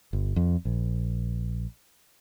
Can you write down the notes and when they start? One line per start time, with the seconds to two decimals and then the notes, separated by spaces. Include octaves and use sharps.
0.13 G1
0.36 F2
0.65 A#1